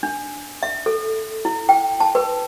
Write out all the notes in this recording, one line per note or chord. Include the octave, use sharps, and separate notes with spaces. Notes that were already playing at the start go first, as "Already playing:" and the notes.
D4
E5
A4
E4
G5
A5
B4